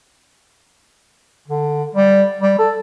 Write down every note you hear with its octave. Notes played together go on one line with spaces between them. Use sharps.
D3
G3
G3
A4